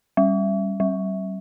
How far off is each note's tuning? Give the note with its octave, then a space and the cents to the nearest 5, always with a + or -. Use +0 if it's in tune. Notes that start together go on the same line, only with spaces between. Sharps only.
G3 +5
G3 -30